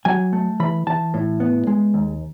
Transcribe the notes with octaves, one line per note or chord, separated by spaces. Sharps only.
F#3 G#5
A3
E3 B5
E3 A5
A2
B3
G#3
D#2